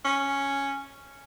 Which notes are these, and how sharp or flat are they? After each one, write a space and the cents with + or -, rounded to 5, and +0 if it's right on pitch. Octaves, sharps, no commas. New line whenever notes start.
C#4 +0